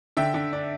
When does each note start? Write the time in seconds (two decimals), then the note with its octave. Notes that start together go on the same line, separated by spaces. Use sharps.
0.17 D3 E5 G5
0.34 D3
0.53 D4